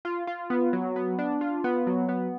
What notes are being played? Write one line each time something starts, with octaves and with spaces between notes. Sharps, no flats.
F4
F4
B3
F#3
B3
D4
F4
B3
F#3
B3